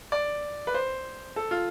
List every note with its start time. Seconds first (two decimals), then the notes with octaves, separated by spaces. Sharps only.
0.12 D5
0.67 B4
0.74 C5
1.36 A4
1.51 F4